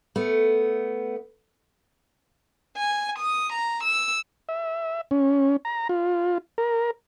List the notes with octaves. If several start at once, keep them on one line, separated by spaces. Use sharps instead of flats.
A3 B3
G#5
D#6
A#5
E6
E5
C#4
A#5
F4
A#4